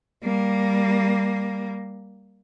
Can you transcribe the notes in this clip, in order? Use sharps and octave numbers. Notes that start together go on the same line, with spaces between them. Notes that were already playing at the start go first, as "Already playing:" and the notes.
G3 A#3